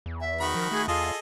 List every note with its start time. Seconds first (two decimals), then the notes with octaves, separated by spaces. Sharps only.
0.06 E2
0.20 E5
0.40 D#3 F#4 B5
0.55 F3 A#4
0.71 A3 G#4
0.88 E2 F4 G#4 A4 D#5